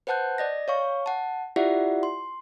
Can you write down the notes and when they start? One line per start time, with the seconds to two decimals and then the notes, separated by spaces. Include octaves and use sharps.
0.07 B4 C5 F#5 A5 F#6 G6
0.38 D5 D#5 A#6
0.68 C#5 F5 C#6
1.06 F#5 A5
1.56 E4 F4 G4 D5 E5 F#5
2.03 C6